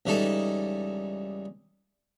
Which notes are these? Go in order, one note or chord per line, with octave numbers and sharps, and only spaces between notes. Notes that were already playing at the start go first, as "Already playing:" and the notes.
C#2 E3 G3 D#4 A4 A5